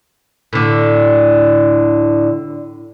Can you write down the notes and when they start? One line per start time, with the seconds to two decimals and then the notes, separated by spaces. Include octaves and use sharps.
0.53 A2 D3